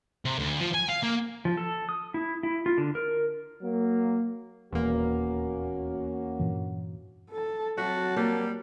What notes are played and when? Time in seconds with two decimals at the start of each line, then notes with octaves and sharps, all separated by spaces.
0.25 C3
0.39 D2
0.60 F3
0.74 G#5
0.89 F5
1.03 A#3
1.45 F3
1.57 A4
1.89 D#6
2.14 E4
2.43 E4
2.66 F4
2.78 D3
2.95 A#4
3.62 F#3 A#3
4.73 D#1 E2 A#3 C#4 F#4
6.39 G2 A#2 E3
7.31 A4 A5
7.78 F#3 C4 F#4 E5 A5
8.16 G3 A#3